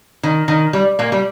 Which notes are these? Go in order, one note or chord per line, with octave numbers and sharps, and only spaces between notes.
D#3
D#3
G3
A#2 A#3
G3